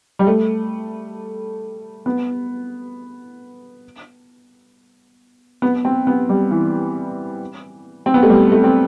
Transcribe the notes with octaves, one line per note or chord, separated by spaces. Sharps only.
G3
A3
B3
B3
C4
B3
G3
E3
C4
B3
A3
G3
A3
C4